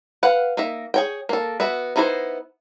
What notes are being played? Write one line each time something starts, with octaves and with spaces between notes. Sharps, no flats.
B4 F5 F#5
A#3 D#4 E5
G#4 C#5 G5
A#3 A4
B3 F#4 E5
B3 D#4 E4 A#4 C5